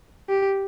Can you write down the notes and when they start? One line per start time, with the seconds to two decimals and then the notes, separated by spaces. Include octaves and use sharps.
0.29 G4